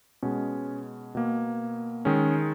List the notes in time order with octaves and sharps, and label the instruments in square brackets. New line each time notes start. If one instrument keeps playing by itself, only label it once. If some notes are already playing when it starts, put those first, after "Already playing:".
[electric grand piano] B2 G#3 C#4
B2 A#3
D#3 G#3 C#4